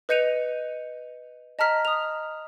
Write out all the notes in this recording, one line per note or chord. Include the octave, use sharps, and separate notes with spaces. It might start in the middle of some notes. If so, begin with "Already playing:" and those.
B4 D#5 G6 C#7 D#7 F7
D#5 A5 A#5 F6 B6
D#6 F7